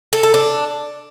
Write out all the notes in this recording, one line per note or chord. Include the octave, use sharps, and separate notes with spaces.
A4
A4
D4